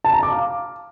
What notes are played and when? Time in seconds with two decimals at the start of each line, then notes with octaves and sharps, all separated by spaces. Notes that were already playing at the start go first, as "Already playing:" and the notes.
0.04 A5
0.14 A#5
0.23 D6
0.32 F5